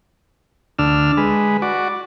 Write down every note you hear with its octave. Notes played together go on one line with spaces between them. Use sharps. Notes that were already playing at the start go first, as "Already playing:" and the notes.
D2 D4 E6 F6
G#3 B4
F#4 D5